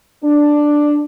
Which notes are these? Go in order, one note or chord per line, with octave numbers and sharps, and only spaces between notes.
D4